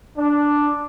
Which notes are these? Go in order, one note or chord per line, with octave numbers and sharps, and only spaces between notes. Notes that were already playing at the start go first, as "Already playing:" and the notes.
D4